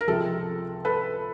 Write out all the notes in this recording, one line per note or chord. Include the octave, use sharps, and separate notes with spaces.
A#4
C#2 C3 F3 G#3 A4
A4 B4